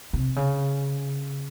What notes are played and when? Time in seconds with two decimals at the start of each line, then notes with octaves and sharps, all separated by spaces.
0.13 C3
0.36 C#3